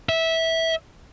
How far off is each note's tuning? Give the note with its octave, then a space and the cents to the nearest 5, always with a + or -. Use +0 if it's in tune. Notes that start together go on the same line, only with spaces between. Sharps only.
E5 -15